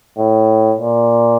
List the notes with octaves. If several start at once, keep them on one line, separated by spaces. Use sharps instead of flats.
A2
A#2